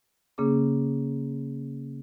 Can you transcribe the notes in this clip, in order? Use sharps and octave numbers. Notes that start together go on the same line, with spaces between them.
C#3 A#3 C#4 G#4 D6